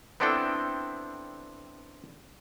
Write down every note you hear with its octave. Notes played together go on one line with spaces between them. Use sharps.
B3 C4 D4 E4 A4 G5